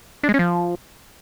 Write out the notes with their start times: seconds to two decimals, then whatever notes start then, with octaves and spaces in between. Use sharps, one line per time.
0.23 D4
0.29 G#3
0.34 C#4
0.39 F3